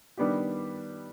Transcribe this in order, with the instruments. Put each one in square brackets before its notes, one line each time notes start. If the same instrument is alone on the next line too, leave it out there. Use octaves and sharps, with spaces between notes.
[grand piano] D#3 G3 B3 D4 G4